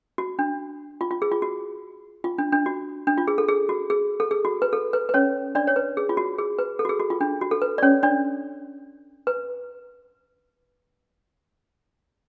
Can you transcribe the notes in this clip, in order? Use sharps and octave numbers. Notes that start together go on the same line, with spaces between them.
F#4
D4
F4
F4
G#4
F4
F#4
F4
D4
D4
F#4
D4
F4
G#4
A4
G#4
F#4
G#4
A4
G#4
F#4
B4
A4
B4
B4
C#4 C#5
D4 D5
C#5
B4
G#4
F4
F#4
G#4
B4
A4
F#4
G#4
F#4
F4
D4
F#4
A4
B4
D5
C#4 C#5
D4 D5
B4